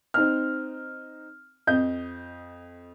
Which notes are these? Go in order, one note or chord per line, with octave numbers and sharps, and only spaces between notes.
C4 D#4 F6
F2 D#5 G6